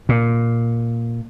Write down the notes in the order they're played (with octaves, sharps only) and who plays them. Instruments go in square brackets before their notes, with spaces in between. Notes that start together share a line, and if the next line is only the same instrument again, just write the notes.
[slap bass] A#2